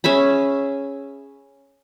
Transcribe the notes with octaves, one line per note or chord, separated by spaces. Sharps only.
C#4 G#4 E5 B5